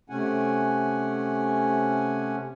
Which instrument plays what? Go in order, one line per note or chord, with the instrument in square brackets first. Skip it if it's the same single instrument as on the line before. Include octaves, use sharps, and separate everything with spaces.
[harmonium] C3 A3 C#4 F#5 G#5